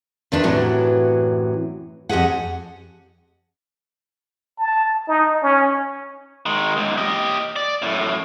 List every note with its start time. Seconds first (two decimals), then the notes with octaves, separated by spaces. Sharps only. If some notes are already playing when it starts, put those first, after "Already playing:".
0.32 E2 D#3 D4 F4 E5
0.43 F#2 A2 C3 E3 F#3
2.09 F2 D#3 G4 G#4 F#5
4.58 A5
5.08 D#4
5.43 C#4
6.46 D#3 G#3
6.77 C#2 G#2
6.98 G4 D#5
7.56 D5
7.82 F#2 A2